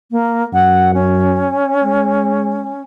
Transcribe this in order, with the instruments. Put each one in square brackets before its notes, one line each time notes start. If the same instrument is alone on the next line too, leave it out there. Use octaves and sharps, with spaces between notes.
[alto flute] A#3
[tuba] F#2 [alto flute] F#5
[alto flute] C#4
[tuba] G#3